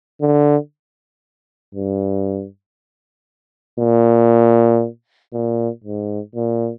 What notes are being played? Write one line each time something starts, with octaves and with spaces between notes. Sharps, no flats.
D3
G2
A#2
A#2
G#2
A#2